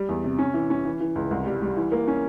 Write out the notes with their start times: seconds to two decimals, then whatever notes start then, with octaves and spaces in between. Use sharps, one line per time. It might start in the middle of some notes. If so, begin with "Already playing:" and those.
Already playing: G3
0.09 E2
0.24 C3
0.39 C#4
0.54 E3
0.70 C#4
0.85 E3
1.00 E3
1.15 C#2
1.31 C2
1.46 G3
1.62 G3
1.77 E3
1.92 A#3
2.08 C#4